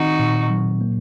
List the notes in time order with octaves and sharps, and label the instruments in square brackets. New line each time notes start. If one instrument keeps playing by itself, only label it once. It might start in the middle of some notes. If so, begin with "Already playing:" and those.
Already playing: [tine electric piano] D#3 C4 [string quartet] D#4 F#4
[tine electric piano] A#2
F#3
A#3